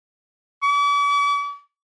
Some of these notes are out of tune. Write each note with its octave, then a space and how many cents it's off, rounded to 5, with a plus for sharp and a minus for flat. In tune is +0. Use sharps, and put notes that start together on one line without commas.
D6 -45